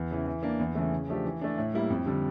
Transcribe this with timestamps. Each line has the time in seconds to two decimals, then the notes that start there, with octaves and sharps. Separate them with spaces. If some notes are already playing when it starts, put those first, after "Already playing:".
Already playing: E2
0.11 C#3 E3
0.26 E3
0.43 A#3 D4
0.60 E2
0.75 C#3 E3 A3
0.91 C#3
1.08 F3 A3 D4 G4
1.25 E3
1.41 A3 D4
1.57 A2
1.74 G3 A#3 E4
1.90 F2
2.06 D3 G3